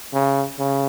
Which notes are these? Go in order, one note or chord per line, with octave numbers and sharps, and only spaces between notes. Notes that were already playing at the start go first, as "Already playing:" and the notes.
C#3
C#3